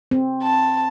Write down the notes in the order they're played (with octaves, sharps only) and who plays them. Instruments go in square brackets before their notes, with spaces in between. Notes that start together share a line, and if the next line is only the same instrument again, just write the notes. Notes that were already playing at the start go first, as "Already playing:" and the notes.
[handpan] C4
[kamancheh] A5